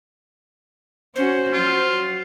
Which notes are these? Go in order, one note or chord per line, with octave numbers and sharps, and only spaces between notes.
C#4 F#4 C5
F#3 F4